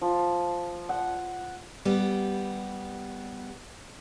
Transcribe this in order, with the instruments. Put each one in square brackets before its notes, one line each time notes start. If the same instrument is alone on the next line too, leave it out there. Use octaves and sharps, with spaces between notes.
[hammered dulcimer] F3
F#5
[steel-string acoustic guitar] G3 B3 G4